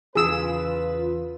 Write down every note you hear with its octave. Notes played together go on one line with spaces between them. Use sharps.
E2 C#3 E3 F4 G#4 B4 E6